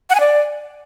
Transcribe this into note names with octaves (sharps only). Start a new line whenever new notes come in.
F#5
G#5
D5